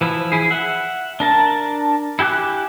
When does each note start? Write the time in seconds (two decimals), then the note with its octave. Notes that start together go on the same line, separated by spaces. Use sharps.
0.01 E3 F3 E4
0.32 E4 G#4
0.51 E5 F#5
1.20 D4 A#4 A5
2.19 E4 G4 G#5 D6 F#6